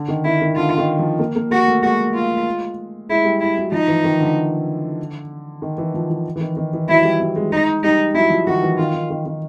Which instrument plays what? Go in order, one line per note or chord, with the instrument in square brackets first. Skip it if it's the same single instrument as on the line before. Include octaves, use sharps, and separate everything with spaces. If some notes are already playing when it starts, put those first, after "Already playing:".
Already playing: [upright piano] D3
D#3
[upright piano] D#3 [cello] E4
[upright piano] D#3
[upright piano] D3 [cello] F4
[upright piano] D#3
F3
A#3
A#3
[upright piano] A#3 [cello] F#4
[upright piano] A3
[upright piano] G#3 [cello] F#4
[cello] F4
[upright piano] G#3 [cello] E4
[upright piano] G3
[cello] E4
[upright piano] F#3
[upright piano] F3 [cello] D#4
[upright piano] E3
D#3
D3
D#3
E3
F3
E3
E3
D#3
D#3
E3
[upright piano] F#3 [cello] E4
[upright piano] G3
F#3
G#3
[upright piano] G#3 [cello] D#4
[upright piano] G3 [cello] D#4
[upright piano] F#3 [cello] E4
[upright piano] F3
[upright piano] D#3 [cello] F#4
[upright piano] E3
[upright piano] D#3 [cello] F4
[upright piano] D#3
D#3
D#3